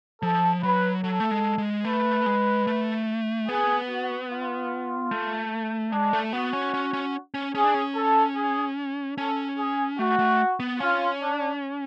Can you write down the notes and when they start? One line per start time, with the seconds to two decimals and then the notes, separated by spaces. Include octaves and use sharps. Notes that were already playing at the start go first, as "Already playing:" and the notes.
0.23 F3 A4
0.63 F#3 B4
1.04 F#3 A4
1.20 A3
1.31 G#3
1.58 G#3
1.85 A3 B4
2.26 G#3
2.67 A3
3.48 B3 G#4
3.89 F#4
4.29 F4
5.11 A3
5.92 G#3 D4
6.13 A3
6.33 B3 F#4
6.53 C#4
6.74 C#4
6.93 C#4
7.34 C#4
7.55 C#4 G#4
7.65 D4
7.74 C#4
7.96 A4
8.36 G#4
9.18 C#4 A4
9.58 G#4
9.99 A3 F#4
10.19 A3
10.60 B3
10.80 C#4 F4
11.22 D4